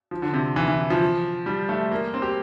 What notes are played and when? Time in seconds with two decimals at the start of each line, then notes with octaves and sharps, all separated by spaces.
0.11 F3
0.22 D3
0.33 C3
0.56 E3
0.68 E3
0.90 F3
1.46 G3
1.69 A3
1.92 A#3
2.14 C4
2.22 G4